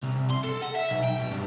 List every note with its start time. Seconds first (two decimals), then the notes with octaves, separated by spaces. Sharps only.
0.03 C2
0.30 C6
0.44 A4
0.62 F#5
0.76 E5
0.90 B1
1.04 G5
1.19 B2
1.31 G2